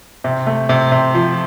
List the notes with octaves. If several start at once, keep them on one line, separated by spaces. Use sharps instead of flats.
C3
A3
C3
C3
F3